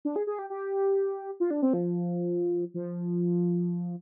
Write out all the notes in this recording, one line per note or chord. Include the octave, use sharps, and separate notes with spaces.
D4
G#4
G#4
G4
G4
F4
D4
C4
F3
F3